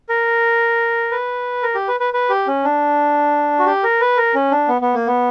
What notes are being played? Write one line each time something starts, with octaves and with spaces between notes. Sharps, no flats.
A#4
B4
A#4
G4
B4
B4
B4
G4
C#4
D4
F#4
G4
A#4
B4
A#4
C#4
D4
B3
B3
A#3
B3